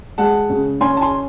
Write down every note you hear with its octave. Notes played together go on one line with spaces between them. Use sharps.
G#3 F#5 A5
C#3
C#4 G#5 C6
A5
G#5 C6